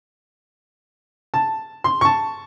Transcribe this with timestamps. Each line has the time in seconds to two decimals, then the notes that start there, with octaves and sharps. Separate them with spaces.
1.34 A5
1.84 C6
2.01 A5 C#6